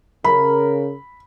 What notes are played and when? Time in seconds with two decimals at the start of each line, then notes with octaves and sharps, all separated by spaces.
0.25 C#3 A#4 B5